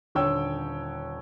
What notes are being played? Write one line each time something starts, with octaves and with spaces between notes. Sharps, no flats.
D#1 D3 C#5 G5 E6